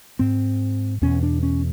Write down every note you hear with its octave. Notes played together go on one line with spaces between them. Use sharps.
G#2 C4
E2 B2 C#4
D4
C#4